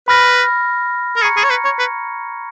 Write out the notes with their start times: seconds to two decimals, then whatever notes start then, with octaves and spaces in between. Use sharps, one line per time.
0.08 B4 B5 F6 A#6
1.16 A#4
1.21 G#4 A#5 C#6 G#6 C#7
1.37 G#4
1.44 C#5
1.50 B4
1.65 C#5
1.79 B4